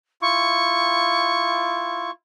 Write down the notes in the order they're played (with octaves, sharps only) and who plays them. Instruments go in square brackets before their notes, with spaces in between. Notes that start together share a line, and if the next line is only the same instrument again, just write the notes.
[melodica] E4 F4 [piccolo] C#6